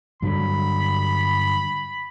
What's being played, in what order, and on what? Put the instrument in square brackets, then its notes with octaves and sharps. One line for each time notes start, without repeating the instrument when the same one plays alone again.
[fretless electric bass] G2 D3 F#3 [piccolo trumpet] B5